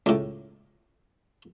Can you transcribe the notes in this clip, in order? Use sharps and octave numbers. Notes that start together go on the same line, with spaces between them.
C#2 A2